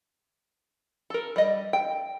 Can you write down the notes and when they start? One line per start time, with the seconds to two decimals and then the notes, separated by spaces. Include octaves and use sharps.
1.10 A4 A#4
1.36 G3 D#5
1.73 G5